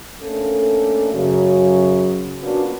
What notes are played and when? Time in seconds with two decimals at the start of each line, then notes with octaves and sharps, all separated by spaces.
0.21 A3 A#3 C#4 D4 A4
1.13 F#2 C#3 F#3
2.41 A#3 B3 C#4 D4 F4 F#4